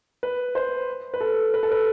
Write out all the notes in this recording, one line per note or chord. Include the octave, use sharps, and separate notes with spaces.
B4
C5
B4
A4
B4
A4
B4